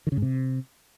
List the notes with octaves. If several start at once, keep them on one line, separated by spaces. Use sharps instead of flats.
D#3
C#3
G#2
C3